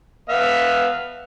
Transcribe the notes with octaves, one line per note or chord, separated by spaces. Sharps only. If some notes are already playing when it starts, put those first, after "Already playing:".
B3 E5 F5